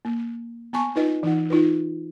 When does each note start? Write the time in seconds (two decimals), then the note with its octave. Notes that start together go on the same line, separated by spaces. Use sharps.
0.05 A#3
0.73 B3 G#5 A5 C#6
0.96 D#4 F4 B4 D#5
1.23 E3 D#4 F#5
1.50 D#4 F4 B4